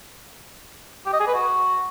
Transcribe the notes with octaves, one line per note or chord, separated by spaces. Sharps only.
G4
D#5
G#4
B4
F#4